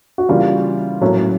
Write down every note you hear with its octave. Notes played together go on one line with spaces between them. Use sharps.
F#4
C#3 E3 G3 A#3 F4
A2 F#3 A#3 C#4